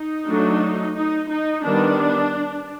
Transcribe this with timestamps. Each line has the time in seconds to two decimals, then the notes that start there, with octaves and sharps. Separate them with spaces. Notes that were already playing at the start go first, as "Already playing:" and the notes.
Already playing: D#4
0.27 F#3 A3 D4
0.95 D#4
1.30 D#4
1.64 D#3 G3 B3 D4